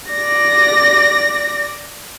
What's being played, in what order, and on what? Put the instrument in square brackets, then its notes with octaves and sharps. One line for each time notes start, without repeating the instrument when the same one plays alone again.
[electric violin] D5 A#6